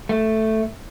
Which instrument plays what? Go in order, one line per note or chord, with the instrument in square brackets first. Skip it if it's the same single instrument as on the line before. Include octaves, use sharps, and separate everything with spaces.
[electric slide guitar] A3